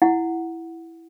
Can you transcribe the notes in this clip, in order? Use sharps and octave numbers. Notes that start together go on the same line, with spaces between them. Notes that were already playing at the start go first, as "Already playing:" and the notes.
E4 F#5